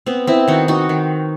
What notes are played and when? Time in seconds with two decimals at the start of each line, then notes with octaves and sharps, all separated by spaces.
0.06 B3 C4
0.27 C4 E4
0.48 D#3 D#4 F#4
0.68 D#4 F#4
0.89 D#3